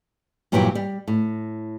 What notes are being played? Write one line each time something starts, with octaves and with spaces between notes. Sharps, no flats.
G2 A#2 E3 F#3 E4 G4
G3
A2